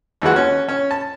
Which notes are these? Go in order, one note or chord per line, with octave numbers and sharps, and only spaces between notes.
D#2 E3 G#3 F#4
C#4
C#4
A5